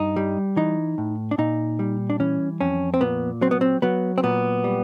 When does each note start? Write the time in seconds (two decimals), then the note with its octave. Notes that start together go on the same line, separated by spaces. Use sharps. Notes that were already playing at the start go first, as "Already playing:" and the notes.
Already playing: G2 D#4
0.16 G3
0.56 E3 D#4
0.98 A2
1.31 D4
1.38 A#2 D#4
1.79 G3
2.10 D4
2.20 E3 C#4
2.61 F2 C#4
2.94 C4
3.01 A#2 B3
3.41 F#3 C4
3.51 B3
3.61 C4
3.82 F#3 B3
4.18 C4
4.23 A#2 B3
4.64 G3